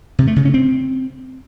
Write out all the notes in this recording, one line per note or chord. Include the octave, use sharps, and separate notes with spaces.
C3
A3
C#3
C#4
C4